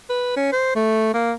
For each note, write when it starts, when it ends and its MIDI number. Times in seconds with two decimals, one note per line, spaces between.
0.09 0.34 71
0.36 0.52 61
0.52 0.74 72
0.76 1.13 57
1.14 1.32 58